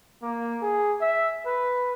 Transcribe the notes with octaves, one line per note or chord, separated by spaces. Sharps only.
A#3
G#4
E5
B4